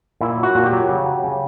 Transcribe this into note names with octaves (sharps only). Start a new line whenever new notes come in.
A#2 E4
F#3
F#4
A#2
G4
F#3
C#3
F#3
C#3